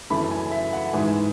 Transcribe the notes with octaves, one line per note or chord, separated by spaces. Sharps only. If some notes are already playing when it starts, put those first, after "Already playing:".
F#2 C#3 E3 A3 B5
G#5
E5
F#5
G#2 E3 G#3 G#5